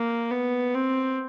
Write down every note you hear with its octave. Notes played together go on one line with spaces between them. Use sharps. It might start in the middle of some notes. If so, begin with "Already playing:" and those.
Already playing: A#3
B3
C4